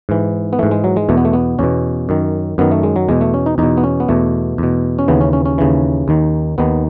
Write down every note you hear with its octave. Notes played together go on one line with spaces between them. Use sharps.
G#2 E3
B3
G#2 E3 A3
G#3
F#3
G#3
E2 B2 A3
B3
A3
B3
E2 B2 C#4
F#2 D#3
F#2 D#3 B3
A3
G#3
F#3
E2 B2 G#3
A3
C#4
D#4
E2 B2 D#4
B3
C#4
B3
E2 B2 A3
E2 B2
C#4
D#2 C#3 E3 B3
C#4
C#4
C#4
D#2 C#3 E3
D#2 D#3
D#2 D#3 B3